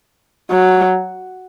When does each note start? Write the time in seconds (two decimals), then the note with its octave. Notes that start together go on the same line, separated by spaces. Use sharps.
0.51 F#3